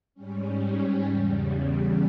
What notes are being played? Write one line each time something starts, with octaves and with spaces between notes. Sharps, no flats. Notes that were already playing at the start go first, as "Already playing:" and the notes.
G#2 G3 C#4
E2 C#3 G3